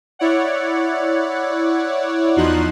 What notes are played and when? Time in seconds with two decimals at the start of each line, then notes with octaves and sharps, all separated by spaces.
0.19 E4 C#5 D5 F#5
2.36 E2 F3 D#4 F#4 C6 F#6